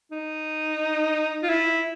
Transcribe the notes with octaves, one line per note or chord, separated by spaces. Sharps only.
D#4
F4
E4